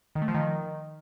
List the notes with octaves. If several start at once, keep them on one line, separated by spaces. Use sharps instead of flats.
D#3
A3
F3
D#3